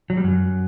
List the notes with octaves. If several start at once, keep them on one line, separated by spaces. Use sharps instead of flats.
F#3
G3
F#2 F#3